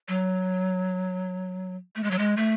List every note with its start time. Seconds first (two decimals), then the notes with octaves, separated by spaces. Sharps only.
0.08 F#3
1.96 A3
2.03 G#3
2.11 F#3
2.18 G#3
2.37 A3